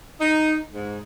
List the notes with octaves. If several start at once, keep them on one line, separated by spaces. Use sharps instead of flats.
D#4
G#2